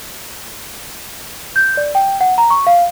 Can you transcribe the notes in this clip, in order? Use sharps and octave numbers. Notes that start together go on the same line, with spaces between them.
G6
D5
G5
F#5
A#5
C#6
F5